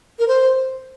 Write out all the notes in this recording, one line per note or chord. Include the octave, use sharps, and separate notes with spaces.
A#4
C5